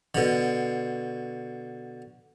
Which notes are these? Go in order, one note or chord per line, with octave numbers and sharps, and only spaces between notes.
B2 D3